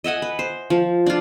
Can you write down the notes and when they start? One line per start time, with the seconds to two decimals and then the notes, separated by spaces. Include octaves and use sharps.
0.04 D#5 E5 F#5 G#5
0.22 B4
0.39 C5
0.70 F3
1.06 D4 F4